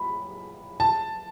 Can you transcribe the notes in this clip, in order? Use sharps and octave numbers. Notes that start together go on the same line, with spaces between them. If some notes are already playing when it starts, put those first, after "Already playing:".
Already playing: B5
A5